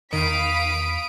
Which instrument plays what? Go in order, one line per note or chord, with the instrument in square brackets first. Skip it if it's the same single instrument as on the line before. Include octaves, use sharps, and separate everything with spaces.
[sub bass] E2 [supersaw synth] D#3 [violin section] F5 B5 B6 [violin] D#6 D7